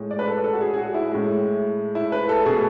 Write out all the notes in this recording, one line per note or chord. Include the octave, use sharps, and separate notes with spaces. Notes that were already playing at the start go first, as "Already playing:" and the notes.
Already playing: A2 G#3
D5
B4
A4
A4
F#4
G#4
G#4
F#4
E4
A2 G#3
E4
B4
A4
B2 A3 G#4